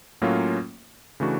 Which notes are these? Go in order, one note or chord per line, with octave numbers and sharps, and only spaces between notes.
A2 F#3 A#3 C#4 F4
C#3 E3 A3 D4 F#4